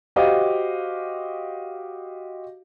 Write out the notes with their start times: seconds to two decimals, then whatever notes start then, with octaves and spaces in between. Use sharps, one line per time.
0.16 F#4 G4 C5 D#5 F5